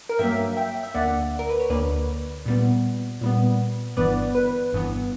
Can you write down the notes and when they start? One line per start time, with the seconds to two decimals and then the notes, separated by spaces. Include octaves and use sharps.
0.09 A#4
0.19 G2 F#3 A#3 E5 G5
0.57 E5 G5
0.83 E5
0.94 D2 D3 A#3 D5 F#5
1.39 A#4
1.49 B4
1.60 C#5
1.70 D2 D3 A#3 B4 D5
2.46 A#2 G3 B3
3.21 A#2 G3 B3
3.97 G1 G2 E3 B3 B4 D5
4.35 B4
4.73 G1 G2 E3 B3